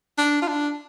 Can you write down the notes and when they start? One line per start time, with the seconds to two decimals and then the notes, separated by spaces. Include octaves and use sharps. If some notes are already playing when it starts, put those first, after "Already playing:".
0.18 D4
0.42 F4
0.48 D4